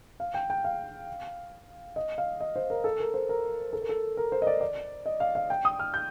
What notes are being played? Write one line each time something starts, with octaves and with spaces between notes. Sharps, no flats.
F5
G5
G5
F5
D#5
F5
D#5
C5
A#4
A4
A#4
C5
A#4
A4
A#4
A4
A#4
C5
D#5
D5
D5
D#5
F5
F5
G5
D#6
F6
G6